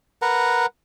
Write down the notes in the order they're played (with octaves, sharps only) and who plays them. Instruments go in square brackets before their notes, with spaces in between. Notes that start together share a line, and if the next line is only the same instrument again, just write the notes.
[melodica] A#4 B4 F#5 A#5